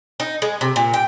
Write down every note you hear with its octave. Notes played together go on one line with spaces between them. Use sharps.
D#4
G#3
C3
A#2
G5